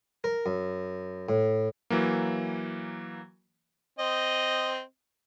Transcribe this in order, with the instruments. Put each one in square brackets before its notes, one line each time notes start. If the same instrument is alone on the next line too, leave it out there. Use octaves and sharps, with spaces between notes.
[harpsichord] A#4
F#2
A2
[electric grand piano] E3 F#3 A#3
[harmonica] C4 D#5